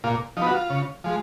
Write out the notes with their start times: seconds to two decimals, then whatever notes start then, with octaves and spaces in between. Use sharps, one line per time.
0.04 A#2 F4
0.37 F3 D#4
0.42 B3
0.47 F#4
0.54 F4
0.70 C#3
1.04 F3 G#3